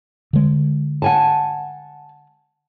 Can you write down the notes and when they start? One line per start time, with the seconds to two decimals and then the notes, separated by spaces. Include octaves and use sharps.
0.33 D3 G#3
1.02 F#5 G#5 A5